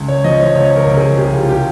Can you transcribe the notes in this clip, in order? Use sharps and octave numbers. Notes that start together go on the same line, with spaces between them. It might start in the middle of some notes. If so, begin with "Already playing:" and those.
Already playing: C#2
C#5
F3 D#5
C#5
C#2 C#5
A#4
C#2
G#4
C2 G4
F4
G4